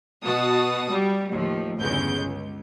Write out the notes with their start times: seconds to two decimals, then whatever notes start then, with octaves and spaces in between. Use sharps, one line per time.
0.24 B2 F#4 A5 D#6
0.91 G3
1.32 D#2 A2 F3
1.79 G1 E2 C#3 G#3 G6
2.21 C#2